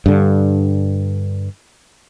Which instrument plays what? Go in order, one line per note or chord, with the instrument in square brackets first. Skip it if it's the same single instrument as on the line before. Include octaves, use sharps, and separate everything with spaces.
[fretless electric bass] G2 D3